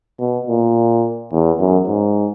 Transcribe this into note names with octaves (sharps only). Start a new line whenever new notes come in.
B2
A#2
E2
F#2
G#2